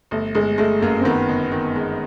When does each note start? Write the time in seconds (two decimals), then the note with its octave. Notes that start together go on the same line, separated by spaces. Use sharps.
0.11 G1 A3
0.35 G1 G#3
0.58 G#3 A3
0.82 F#2 A#3
1.01 C4
1.05 D#3 B3
1.29 G1
1.52 D#3
1.76 G#3